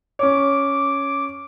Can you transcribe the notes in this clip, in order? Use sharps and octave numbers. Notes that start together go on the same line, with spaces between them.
C#4 C#5 D6